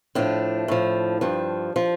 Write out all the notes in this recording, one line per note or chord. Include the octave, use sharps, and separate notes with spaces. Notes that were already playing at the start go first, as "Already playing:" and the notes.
A2 F3 D4
A2 F3
G2 F3
F3